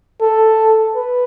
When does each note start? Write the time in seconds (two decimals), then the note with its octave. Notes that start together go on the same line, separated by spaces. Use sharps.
0.21 A4
0.95 B4